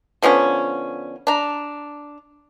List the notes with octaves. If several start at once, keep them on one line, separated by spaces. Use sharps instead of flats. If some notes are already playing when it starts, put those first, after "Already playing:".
D3 F3 B3 C#4
D4 A#5